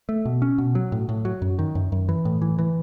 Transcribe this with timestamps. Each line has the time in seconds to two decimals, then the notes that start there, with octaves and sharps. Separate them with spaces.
0.09 A3
0.25 B2
0.42 C#4
0.58 B2
0.75 F#3
0.92 A2
1.09 A2
1.25 F#3
1.42 F#2
1.59 D#3
1.75 F#2
1.92 F#2
2.09 E3
2.25 A2
2.42 E3
2.59 E3